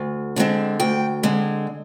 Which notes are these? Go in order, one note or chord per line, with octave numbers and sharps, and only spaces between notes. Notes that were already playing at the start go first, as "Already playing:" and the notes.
Already playing: D2
D3 F3 G#3 C4
D2 G5
D3 G#3 C4